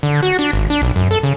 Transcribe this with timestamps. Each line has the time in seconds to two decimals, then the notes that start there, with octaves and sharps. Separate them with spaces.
0.03 D3
0.23 F#4
0.39 D4
0.53 G#1
0.70 D4
0.82 B1
0.96 F#2
1.11 A4
1.23 C#3